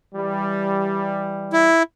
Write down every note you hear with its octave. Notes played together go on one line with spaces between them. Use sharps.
E3 G3
E4